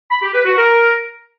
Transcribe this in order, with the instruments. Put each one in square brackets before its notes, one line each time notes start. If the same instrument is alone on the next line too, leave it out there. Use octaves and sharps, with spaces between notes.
[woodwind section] B5
G4
B4
F#4
A#4